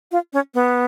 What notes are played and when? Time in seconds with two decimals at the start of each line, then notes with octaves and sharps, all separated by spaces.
0.12 F4
0.33 C#4
0.54 B3